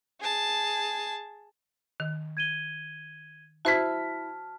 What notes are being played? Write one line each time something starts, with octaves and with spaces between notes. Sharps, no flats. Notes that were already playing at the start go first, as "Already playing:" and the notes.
G#4 A5
D#3
G#6 D#7 G7
E4 F#4 C5 A5 F6 G#6 B6